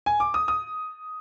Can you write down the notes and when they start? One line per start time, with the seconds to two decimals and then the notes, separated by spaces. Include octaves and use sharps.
0.06 G#5
0.20 D6
0.34 D#6
0.48 D#6